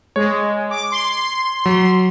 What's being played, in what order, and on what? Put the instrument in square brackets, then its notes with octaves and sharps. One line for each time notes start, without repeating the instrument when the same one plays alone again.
[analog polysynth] G#3 [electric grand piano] C#5
[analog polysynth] D6
C6
[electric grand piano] F#3